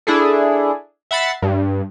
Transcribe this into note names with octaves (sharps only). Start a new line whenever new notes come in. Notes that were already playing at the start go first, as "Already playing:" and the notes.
D4 E4 G#4 A4
E5 F#5 B5 A6 C7
G2